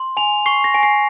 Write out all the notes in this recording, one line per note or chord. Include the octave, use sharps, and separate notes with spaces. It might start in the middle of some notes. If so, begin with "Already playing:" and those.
Already playing: C6
G#5 F7
C#6 C7
A#6
G#5
C7